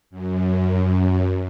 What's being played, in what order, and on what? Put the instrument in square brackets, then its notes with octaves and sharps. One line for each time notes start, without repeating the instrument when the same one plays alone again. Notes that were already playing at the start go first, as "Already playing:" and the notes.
[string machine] F#2